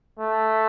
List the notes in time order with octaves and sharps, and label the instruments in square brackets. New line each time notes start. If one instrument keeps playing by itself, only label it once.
[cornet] A3